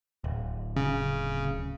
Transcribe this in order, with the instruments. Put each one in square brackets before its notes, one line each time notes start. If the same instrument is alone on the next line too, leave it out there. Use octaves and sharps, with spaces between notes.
[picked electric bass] D1
[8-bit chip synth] C#3